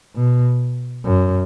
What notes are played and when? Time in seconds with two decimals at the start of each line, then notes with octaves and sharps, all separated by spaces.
0.16 B2
1.05 F#2